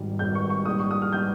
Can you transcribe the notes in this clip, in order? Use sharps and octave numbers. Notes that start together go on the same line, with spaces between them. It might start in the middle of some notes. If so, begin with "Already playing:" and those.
Already playing: G#1 G#2 G3
G#1 G#2 G3 G6
C#6
C#6
A#1 G#2 G3 D#6
C#6
D#6
F6
G3 G6